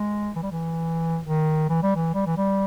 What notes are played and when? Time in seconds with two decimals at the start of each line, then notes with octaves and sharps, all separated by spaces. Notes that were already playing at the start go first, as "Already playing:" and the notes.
Already playing: G#3
0.35 E3
0.43 G3
0.52 E3
1.25 D#3
1.69 E3
1.83 G3
1.95 E3
2.14 G3
2.26 E3
2.37 G3